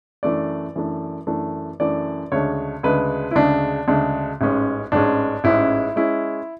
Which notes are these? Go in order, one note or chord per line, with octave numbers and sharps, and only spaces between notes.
F#2 E3 A3 D4 D5
F#2 E3 A3 D4
F#2 E3 A3 D4
F#2 E3 A3 D4 D5
D2 C#3 G#3 D4 C#5
D2 C#3 G#3 D4 B4
E4
D2 C#3 G#3 D4
D2 C#3 G#3 D4
A1 G#2 G#3 C#4
A1 G#2 G#3 C#4 D4
A1 G#2 G#3 C#4 E4
G#3 C#4 E4